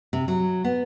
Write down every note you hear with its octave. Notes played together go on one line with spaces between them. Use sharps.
C3
F#3
B3